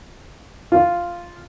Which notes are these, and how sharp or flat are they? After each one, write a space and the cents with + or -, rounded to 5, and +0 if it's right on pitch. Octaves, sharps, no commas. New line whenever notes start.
F4 -5